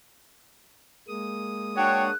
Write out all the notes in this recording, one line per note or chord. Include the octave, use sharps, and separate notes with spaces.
G#3 A#3 D#6
D4 F#4 C#5 G5 F#6